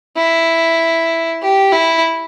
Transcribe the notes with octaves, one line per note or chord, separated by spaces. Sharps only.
E4
G4
E4